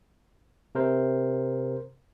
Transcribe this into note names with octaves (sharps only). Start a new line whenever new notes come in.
C3 A#4 C5